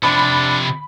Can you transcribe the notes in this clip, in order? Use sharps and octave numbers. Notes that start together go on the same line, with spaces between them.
C3 F3 D4 B5